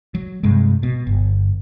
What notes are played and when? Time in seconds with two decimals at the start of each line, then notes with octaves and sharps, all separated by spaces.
0.15 F#3
0.43 G2 C3 G#3
0.83 B2
1.07 G1